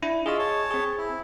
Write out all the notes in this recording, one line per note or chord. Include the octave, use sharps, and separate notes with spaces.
D4 E4
F4 G#4 D#5 E5 C#6
C#5 A5
C4 G#4
E4